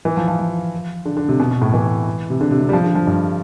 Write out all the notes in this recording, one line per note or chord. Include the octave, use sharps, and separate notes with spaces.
E3
F3
F3
F3
D3
D3
C3
B2
B2
A2
E3
C3
D3
C3
C3
G3
F3
D3
F3
G2